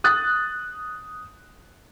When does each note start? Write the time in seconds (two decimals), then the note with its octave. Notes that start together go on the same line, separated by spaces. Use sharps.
0.04 D#6 F#6 A6